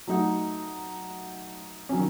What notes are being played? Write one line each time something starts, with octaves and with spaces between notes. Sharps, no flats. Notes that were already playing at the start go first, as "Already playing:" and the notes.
F#3 A3 D#4 F#4
D#3 F#3 C#4